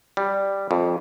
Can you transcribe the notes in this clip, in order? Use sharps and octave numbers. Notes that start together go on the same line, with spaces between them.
G3
F2